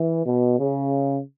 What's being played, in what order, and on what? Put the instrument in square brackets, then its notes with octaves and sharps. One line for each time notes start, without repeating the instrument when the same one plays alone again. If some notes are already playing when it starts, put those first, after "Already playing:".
Already playing: [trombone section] E3
B2
C#3